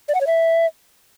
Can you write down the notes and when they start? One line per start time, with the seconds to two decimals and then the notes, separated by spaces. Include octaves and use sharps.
0.09 D5
0.15 F#5
0.21 C#5
0.27 E5